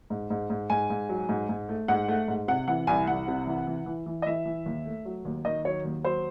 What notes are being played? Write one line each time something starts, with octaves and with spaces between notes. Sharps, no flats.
G#2
G#2
G#2
G#2 G#5
G#2
F#3
G#2
G#2
A3
G#2 F#5
A3
G#2
C3 F#5
E3 F#5
C2 G#5
C2 F#5
C3
E3
E3
E3
E3
D#5
E3 E5
E3
D#2
A3
F#3
D#2
D#3 D#5
F#3 C#5
D#2
F#3 C5